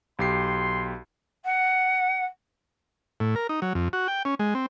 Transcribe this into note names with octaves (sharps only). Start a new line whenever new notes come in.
B1 G4 C6 C7
F#5
A2
A#4
D#4
F#3
F2
F#4
G5
C#4
G#3
C4